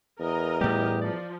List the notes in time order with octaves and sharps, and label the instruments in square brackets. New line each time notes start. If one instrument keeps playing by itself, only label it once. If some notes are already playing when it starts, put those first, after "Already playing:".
[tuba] E2 [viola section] A#4 D#5 A#5
[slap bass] A2 G3 [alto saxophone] G4
[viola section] F3 [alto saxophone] D5